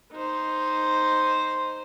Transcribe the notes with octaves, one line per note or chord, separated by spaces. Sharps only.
D#4 C5